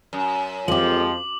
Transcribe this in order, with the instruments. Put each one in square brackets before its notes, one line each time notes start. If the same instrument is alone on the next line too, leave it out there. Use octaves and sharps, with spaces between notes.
[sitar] F#2
[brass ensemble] F2 F3 [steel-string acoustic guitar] G#3 G4 [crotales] D6 F#7